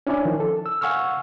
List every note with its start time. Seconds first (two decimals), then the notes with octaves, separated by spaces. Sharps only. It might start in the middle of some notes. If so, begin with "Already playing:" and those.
0.07 C#4 D4 E4 C#5 D5 G#5
0.25 D#3 F3
0.40 A4
0.66 E6
0.81 F5 F#5 G#5 C#6 E6 F6